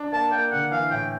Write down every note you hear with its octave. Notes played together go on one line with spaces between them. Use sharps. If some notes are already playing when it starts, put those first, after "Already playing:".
Already playing: D4
A#3 A5
A#3 G5
D3 F#5
E3 F5
A2 G5